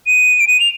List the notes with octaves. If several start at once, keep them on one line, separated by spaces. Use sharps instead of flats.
D#7
D7
D#7
F7